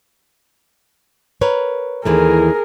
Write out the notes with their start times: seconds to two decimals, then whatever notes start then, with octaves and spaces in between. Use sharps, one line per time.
1.41 A#4 B4 C#5
2.05 D#2 E3 A3 G#4 A#4